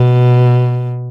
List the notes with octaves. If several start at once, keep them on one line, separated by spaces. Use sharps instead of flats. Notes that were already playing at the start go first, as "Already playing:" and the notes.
Already playing: B2